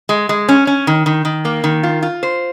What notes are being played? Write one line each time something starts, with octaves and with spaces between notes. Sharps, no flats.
G#3
G#3
C#4
C#4
D#3
D#3
D#3
A#3
D#3
F4
F4
C5